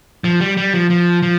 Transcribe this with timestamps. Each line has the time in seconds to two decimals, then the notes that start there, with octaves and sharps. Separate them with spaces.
0.24 F3
0.41 G3
0.57 G3
0.73 F3
0.90 F3
1.23 F3